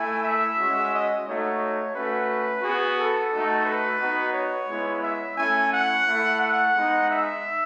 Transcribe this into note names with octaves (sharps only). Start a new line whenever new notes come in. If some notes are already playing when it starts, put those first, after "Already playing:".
Already playing: A3 E4 G#5
E5
G#3 C#4 F#4
D#5
A3 D#4 F#4 C#5
A3 C#4 F#4 B4
B3 F#4 G#4
A4
A3 D#4 F#4
B4
B3 D#4 F#4
C#5
G#3 B3 E4
E5
A3 C#4 E4 G#5
F#5
A3 E4
F#5
G#3 B3 D#4
E5